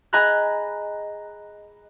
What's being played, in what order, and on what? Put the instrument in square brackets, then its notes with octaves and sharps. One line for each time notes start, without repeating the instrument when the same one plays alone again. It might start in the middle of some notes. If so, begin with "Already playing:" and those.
[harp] G#4 D#5 G#5 A#5 B5 F#6